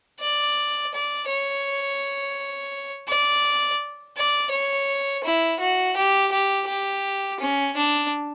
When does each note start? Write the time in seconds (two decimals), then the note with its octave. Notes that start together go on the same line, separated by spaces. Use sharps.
0.21 D5
0.94 D5
1.30 C#5
3.08 D5
4.17 D5
4.52 C#5
5.24 E4
5.60 F#4
5.97 G4
6.32 G4
6.68 G4
7.40 C#4
7.76 D4